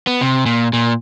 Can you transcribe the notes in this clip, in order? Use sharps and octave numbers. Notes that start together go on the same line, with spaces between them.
B3
C3
A#2
A#2